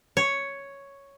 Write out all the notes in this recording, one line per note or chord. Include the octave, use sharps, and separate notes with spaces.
C#5